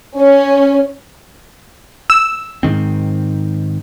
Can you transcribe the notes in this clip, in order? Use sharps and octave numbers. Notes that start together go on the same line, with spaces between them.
C#4
E6
G#2 D#3 C4